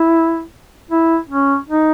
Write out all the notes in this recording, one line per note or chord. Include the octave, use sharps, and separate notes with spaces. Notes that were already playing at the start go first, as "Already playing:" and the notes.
Already playing: E4
E4
C#4
D#4